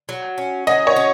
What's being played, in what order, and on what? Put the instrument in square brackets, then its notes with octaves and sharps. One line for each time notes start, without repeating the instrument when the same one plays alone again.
[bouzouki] F#3
C#4
[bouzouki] F#3 [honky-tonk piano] D#5
[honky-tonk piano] C#5
[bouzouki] C#4